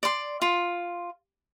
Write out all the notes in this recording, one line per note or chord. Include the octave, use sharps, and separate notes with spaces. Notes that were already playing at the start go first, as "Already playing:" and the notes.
D5 C6
F4